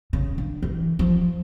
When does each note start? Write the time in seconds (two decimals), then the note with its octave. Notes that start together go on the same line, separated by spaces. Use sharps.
0.13 C#3
0.38 D3
0.63 E3
0.99 F3